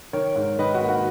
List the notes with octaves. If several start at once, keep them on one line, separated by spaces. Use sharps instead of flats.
D#3 A#4 C#5
G#2
D#3 B4 D#5
F#4
A#3
F#4